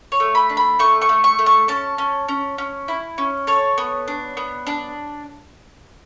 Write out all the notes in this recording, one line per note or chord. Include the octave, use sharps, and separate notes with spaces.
C#5
A3
B5
D4
B5
A3 C#6
C#6
A3
C#6
A3
C#6
C#4 A5
C#4
C#4
C#4
E4
C#4
A4 C#5
B3
D4
B3
D4